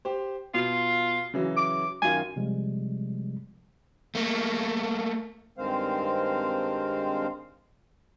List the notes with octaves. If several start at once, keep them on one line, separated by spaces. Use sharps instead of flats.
G4 C5
B2 F4
C#3 E3 F#3
D6
F#2 D#3 F4 G#5
C3 F3 G3 G#3
A3 A#3
G2 D#3 G#3 C4 C5 F5